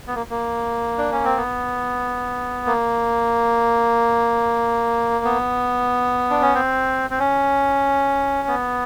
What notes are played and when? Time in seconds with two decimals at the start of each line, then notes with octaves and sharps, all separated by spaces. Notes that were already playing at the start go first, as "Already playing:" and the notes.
0.07 B3
0.15 A#3
0.30 A#3
0.98 D4
1.12 C#4
1.25 C4
1.37 B3
2.66 A#3
5.25 B3
6.30 D4
6.42 C#4
6.55 C4
7.10 C4
7.19 C#4
8.48 B3